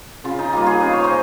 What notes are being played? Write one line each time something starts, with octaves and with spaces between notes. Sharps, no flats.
C#3 F4
D#4
G3 A#3 F4
F4 G#4
C#3 D#5
C#5
C5 D#5